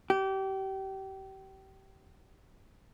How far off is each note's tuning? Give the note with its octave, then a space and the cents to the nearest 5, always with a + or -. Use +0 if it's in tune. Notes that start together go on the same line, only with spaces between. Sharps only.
G4 -30